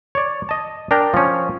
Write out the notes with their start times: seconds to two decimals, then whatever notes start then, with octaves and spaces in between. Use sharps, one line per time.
0.15 C#5 D5
0.49 D#5 A5
0.91 D4 A#4 G5 A#5
1.14 F3 C#4